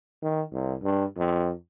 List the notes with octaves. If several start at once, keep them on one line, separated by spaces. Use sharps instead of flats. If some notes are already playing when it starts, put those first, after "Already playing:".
D#3
C2
G2
F2